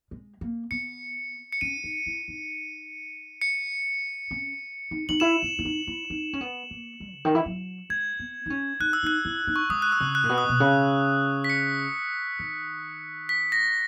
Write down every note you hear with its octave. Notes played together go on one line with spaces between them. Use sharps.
G#3
A#3
B3 C#7
C#7
C#4 D#7
D#4
E4
D#4
C#7
C#4
D#4
D#4 F#7
E4 E7
E4
E4
D#4
E4
D#4
C#4
B3
A#3
G#3
C#3
D#3
E3
F#3
G#3 G#6
B3
D#4
C#4
D#4 F#6
E6
D#4 F#6
E4
D#4
C#6
G#3 D#6
F#6
E6
C#3
F#6
A#2
B2
D#6
B2
C#3
B6
C#7
D#3
B6
A#6